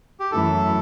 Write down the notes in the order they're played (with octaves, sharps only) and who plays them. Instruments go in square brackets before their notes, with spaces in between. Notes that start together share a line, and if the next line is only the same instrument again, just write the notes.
[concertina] G4
[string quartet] F#2 E3 A3 [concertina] A4